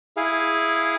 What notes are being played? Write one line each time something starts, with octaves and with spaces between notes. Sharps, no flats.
E4 G#4 F5